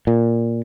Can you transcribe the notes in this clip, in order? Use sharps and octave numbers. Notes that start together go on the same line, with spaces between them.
A#2